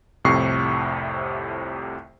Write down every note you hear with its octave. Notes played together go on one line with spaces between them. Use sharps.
C2 F2 A2 C3 C#6 C7